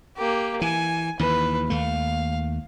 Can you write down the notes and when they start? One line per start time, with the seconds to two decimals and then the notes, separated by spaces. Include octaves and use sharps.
0.17 A#3 G4
0.62 E3 G#5
1.19 D#2 E3 B4
1.70 D#2 A3 F5